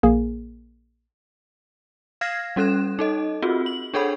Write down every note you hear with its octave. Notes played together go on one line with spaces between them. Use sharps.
A#1 A#3 G#4
F5 F6 G#6 A#6 C7
G3 C#4 A4 F#6 E7
D#4 A4 D#5
C4 F4 F#4 G#4
F#7
D4 G#4 A4 C#5 F#5 B5